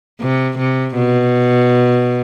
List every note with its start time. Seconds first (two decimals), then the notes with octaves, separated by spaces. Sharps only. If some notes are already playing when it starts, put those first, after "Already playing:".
0.21 C3
0.59 C3
0.96 B2